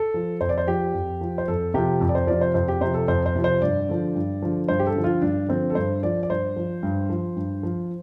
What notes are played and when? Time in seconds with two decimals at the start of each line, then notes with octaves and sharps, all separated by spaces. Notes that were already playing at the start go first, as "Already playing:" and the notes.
Already playing: A4
0.14 F3
0.41 F2 C5
0.49 D5
0.58 C5
0.67 F3 G4
0.94 F2
1.21 F3
1.38 C5
1.48 F2 A4
1.74 C3 F3 G4
2.01 F2
2.09 D5
2.15 C5
2.27 C3 F3 D5
2.41 C5
2.54 F2 C5
2.68 G4
2.81 C3 F3 C5
2.94 A4
3.08 F2 C5
3.26 C5
3.35 C3 F3
3.44 C5
3.62 G2 D5
3.89 D3 F3
4.15 G2
4.42 D3 F3
4.68 G2 C5
4.80 G4
4.87 A4
4.96 D3 F3
5.04 F4
5.22 G2 D4
5.49 D3 F3 C4
5.70 A4
5.75 G2 C5
6.03 F3 D5
6.23 D5
6.30 G2 C5
6.56 F3
6.83 G2
7.09 F3
7.36 G2
7.63 F3